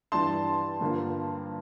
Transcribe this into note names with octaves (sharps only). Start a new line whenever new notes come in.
G2 E3 G3 D4 A5 C6
G2 D3 F3 A#3